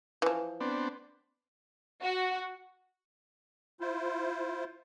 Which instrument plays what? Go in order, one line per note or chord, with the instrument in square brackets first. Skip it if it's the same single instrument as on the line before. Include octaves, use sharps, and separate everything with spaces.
[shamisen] E3 F3
[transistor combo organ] B3 C4 D4
[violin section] F#4
[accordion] E4 F4 C5